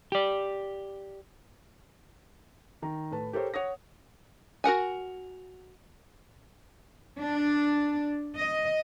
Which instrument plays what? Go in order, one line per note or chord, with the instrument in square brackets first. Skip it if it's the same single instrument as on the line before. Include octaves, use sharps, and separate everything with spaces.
[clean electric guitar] G4 D5
[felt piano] D#3 A#5
A2 B4 A5
G4 A4 A#4 C5 C#5
C#5 F#5 D#6 A#6
[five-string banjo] F#4 A#4 F#5 G#5
[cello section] D4
D#5